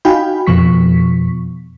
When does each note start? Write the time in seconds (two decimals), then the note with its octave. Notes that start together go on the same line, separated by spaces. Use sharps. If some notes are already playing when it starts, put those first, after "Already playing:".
0.05 D#4 F#4 F5 G5 G#5 B5
0.47 F2 B2 F3 C#6 B6